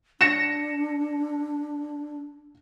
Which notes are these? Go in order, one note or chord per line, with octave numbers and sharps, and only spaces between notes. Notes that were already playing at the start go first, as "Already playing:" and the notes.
D4 A#6 C#7 E7